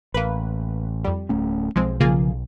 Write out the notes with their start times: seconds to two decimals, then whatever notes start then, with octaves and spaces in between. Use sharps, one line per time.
0.14 A1 A#3 B4
1.04 F2 G3
1.29 D1 A3 C#4
1.76 B1 F3 G#3 C4
2.00 C#3 F3 A#3 F4 G#4